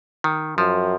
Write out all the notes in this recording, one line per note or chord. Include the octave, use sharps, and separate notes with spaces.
D#3
F#2 F3